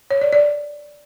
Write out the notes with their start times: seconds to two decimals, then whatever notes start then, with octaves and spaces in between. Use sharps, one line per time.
0.11 C#5
0.22 D5
0.33 D5